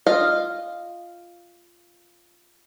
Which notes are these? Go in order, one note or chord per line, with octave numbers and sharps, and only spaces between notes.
F4 D#5 F5